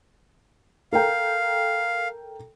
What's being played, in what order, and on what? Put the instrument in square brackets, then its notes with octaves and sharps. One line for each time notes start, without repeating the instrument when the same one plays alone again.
[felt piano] A4 A#4 G5 [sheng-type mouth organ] F5